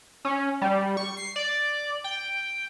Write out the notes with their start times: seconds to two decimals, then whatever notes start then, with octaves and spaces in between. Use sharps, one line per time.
0.25 C#4
0.61 G3
0.97 C#6
1.17 C7
1.36 D5
2.04 G5